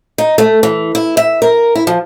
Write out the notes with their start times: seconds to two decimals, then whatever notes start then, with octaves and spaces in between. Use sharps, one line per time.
0.18 D#4
0.38 A3
0.63 E3
0.95 E4
1.17 E5
1.42 A#4
1.75 E4
1.87 F3